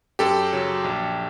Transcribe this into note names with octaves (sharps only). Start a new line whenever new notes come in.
F#2 G4 A4
C#3 F#3
A#1